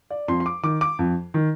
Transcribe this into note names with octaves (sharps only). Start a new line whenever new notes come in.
D5
F2 C6
C6
D6
D#3 D6
D6
F2
D#3